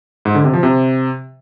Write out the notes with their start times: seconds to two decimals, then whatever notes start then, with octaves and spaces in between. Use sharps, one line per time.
0.25 G#2
0.35 D3
0.44 C3
0.53 F3
0.63 C3